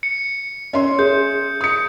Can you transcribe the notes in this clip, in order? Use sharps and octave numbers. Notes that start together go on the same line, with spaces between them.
C#7
C#4 E5 C6
G#4 G6
D#6 C#7